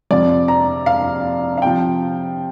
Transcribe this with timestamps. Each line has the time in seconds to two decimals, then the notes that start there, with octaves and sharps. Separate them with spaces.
0.11 F2 C3 F3 D5
0.48 A#5
0.86 F5
1.57 F5
1.62 G5
1.65 C3 F3